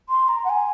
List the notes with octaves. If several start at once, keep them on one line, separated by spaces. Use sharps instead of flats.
C6
A#5
F#5
G#5